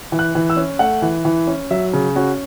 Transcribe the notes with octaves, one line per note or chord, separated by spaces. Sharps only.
E3
F#6
E3
E6
C#4
A3 F#5
E3
E3
C#4
F#3 E5
C#3
C#4 F#4